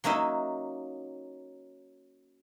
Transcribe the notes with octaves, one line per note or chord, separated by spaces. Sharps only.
F#3 A#3 C#4 D#4 E5